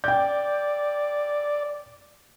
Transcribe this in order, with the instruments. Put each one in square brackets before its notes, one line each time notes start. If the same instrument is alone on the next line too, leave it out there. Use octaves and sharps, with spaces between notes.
[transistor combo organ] D5 [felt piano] G5 G6